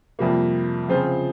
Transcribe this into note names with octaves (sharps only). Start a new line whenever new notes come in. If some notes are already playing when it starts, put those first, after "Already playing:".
F2 C3 G3 A#3
C#3 F3 C4 F4 C5